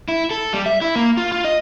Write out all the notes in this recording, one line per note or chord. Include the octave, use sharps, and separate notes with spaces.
E4
A4
G3
E5
E4
A#3
F4
F4
D#5